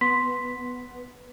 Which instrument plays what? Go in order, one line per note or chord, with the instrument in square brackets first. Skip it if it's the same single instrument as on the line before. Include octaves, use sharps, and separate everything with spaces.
[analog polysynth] B3 [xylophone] C6 B6